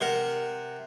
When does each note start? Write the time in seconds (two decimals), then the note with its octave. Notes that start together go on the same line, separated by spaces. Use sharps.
0.01 C3 A#4 F#5